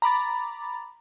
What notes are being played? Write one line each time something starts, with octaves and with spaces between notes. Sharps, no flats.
A#5 B5 D6 A6